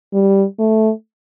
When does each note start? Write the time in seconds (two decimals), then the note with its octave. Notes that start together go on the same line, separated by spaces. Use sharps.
0.13 G3
0.59 A3